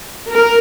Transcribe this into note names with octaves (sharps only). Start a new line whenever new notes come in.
A#4